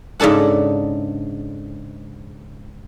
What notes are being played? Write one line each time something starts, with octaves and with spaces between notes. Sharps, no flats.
G#2 C#3 D4 A4 F#5